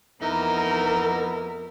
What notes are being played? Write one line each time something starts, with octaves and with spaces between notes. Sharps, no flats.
F2 E3 B3 D#4 E4 A#4